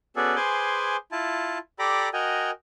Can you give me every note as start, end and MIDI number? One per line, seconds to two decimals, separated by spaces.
0.16 0.36 59
0.16 0.36 61
0.16 0.36 66
0.16 0.36 68
0.16 0.36 69
0.16 0.36 74
0.36 0.97 68
0.36 0.97 71
0.36 0.97 72
0.36 0.97 80
0.36 0.97 84
0.36 0.97 86
1.12 1.58 64
1.12 1.58 65
1.12 1.58 81
1.79 2.09 67
1.79 2.09 69
1.79 2.09 74
1.79 2.09 82
1.79 2.09 83
1.79 2.09 86
2.13 2.51 66
2.13 2.51 70
2.13 2.51 75
2.13 2.51 79
2.13 2.51 80